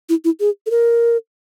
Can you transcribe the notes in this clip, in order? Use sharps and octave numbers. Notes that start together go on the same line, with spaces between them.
E4
E4
G#4
A4
A#4